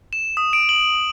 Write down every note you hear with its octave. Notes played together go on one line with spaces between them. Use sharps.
E7
D#6
D7
F#7